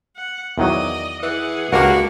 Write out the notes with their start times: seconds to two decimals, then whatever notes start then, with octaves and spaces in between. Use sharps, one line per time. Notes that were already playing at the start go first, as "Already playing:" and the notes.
0.16 F#5
0.58 E2 D#3 F#3 D5 D#5
1.23 E3 G#4 F#5
1.73 C#2 G2 A#3 F#4 A#4